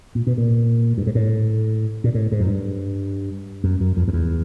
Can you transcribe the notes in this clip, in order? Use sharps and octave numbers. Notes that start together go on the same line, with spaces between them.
A#2
B2
A#2
G2
G#2
A2
A#2
A2
G#2
F#2
G2
F#2
F#2
F2
F2
E2